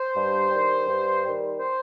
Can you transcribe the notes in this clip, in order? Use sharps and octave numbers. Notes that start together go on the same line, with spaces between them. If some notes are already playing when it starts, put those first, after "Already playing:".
Already playing: C5
G2
D#3 G3
G2
D#3 G3
C5